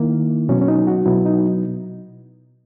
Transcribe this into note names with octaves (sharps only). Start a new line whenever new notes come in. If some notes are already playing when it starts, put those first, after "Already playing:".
Already playing: D#3 A#3 E4
B2 F#3 B3 C#4
C#4
D#4
F#4
B2 F#3 B3 E4
D#4